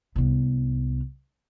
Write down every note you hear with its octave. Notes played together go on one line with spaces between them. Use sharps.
C2 B3